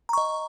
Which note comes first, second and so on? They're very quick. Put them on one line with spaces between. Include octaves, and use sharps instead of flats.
A#5 C#6 D#5